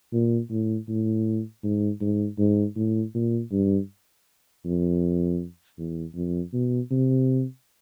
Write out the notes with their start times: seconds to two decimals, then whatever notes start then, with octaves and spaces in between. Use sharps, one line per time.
0.13 A#2
0.50 A2
0.89 A2
1.64 G#2
2.01 G#2
2.38 G#2
2.76 A2
3.15 A#2
3.52 G2
4.65 F2
5.78 E2
6.15 F2
6.54 B2
6.91 C3